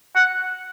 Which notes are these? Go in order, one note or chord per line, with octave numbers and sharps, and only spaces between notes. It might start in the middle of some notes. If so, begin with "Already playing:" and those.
F#5